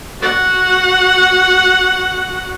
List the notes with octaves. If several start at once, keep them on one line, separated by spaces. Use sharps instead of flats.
F#4 F#5